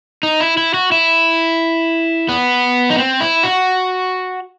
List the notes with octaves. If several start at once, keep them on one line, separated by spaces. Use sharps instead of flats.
D#4
E4
E4
F#4
E4
B3
D#4
C4
E4
F#4